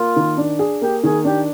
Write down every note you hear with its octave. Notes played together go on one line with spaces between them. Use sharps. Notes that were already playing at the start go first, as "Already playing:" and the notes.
Already playing: A#3 F4
D#3
D4
G#4
A#3 G4
D#3 G#4
D4 G4